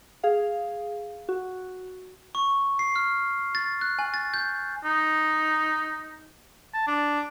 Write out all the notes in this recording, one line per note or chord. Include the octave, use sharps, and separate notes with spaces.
G#4 F5
F#4
C#6
C7
F6
A6
F#6
G#5
A6
G6
D#4
A5
D4